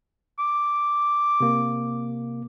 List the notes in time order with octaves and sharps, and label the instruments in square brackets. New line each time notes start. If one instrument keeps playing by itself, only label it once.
[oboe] D6
[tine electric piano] C3 A#3